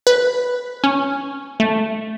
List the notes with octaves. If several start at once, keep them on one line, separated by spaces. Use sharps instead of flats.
B4
C#4
A3